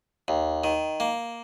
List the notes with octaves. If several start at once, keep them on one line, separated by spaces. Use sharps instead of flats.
D#2
D#3
A#3